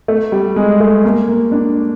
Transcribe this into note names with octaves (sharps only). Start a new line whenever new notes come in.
A3
G3
G#3
A3
A#3
A#3
D4